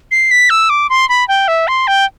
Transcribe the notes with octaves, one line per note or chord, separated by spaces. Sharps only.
C7
B6
E6
D6
C6
B5
G5
E5
C6
G5